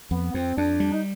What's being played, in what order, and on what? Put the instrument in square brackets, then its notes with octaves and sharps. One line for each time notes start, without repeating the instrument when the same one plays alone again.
[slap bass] F2 [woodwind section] B3
[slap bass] F2 [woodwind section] C4
[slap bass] F2 [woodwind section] D4
[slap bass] G3
[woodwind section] D#4